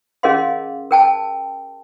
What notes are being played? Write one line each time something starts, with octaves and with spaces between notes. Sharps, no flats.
C#4 G#4 A#4 D#5 F5 C6
A#4 G5 A5